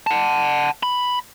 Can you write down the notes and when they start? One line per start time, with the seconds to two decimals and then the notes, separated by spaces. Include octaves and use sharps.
0.07 F#5 A5
0.83 B5